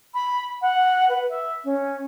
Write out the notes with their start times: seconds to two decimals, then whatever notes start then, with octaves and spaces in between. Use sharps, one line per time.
0.14 B5
0.61 F#5
1.08 B4
1.29 E5
1.64 C#4